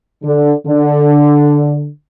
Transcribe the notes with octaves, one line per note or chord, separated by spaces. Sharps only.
D3
D3